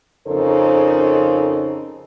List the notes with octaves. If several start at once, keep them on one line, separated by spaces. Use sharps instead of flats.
F2 C#3 D#4 A4 A#4 C5